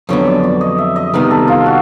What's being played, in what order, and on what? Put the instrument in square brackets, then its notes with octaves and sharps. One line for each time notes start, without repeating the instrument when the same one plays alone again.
[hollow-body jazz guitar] F2 D3 F#3 B3 [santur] C#5
[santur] D5
D5
D#5
E5
D#5
[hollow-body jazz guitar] C3 D#3 G3 B3 [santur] A#4
[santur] A4
F4
F#4